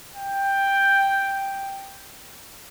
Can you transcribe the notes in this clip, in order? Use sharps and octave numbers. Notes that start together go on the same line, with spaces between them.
G5